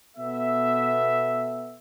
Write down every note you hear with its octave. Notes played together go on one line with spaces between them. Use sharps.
B2 B3 A4 E5